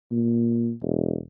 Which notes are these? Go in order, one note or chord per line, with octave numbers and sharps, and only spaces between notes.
A#2
E1